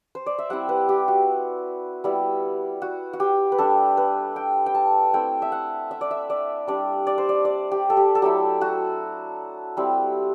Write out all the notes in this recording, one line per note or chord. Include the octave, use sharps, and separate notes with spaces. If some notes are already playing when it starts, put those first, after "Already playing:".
C5
D5
E5
G3 C4 E4 F#5
B4
G4
F#4
G3 B3 E4
F#4
F#4
G4
B4
G3 D4 A4
B4
G5
G5
A5
A3 C4 E4 G5
E5
F#5
E5
D5
E5
D5
G3 D4 D5
D5
C5
D5
D5
G4
A4
G4
A4
F#3 A3 E4 G4
F#4
G3 C4 E4